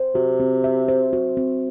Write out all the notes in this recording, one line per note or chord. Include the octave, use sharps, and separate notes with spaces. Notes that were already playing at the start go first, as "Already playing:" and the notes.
Already playing: C5
C3 F#4
C4
E5
C5
F#4
C4